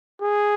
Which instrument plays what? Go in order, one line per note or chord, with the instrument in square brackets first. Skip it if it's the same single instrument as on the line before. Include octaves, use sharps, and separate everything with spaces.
[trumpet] G#4